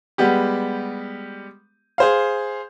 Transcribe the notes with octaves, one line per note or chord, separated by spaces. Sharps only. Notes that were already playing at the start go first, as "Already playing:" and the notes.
G3 G#3 B3 G4
G#4 C5 F5